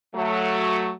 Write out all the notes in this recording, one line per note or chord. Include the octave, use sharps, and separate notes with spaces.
F#3 A3